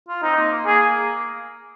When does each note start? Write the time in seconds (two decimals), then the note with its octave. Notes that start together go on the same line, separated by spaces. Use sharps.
0.09 F4
0.23 C4 D#4
0.37 A#3
0.53 A#3
0.66 A#3 G#4